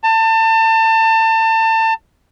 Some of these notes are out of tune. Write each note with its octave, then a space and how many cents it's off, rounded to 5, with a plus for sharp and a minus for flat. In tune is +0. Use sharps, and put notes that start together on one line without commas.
A5 +30